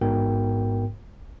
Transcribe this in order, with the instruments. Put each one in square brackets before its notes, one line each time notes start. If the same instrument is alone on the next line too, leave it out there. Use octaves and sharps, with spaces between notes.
[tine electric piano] A1 G#2 B3 F#4 A#4 G5